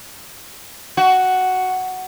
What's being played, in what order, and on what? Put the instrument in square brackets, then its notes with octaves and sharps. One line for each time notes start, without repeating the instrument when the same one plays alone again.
[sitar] F#4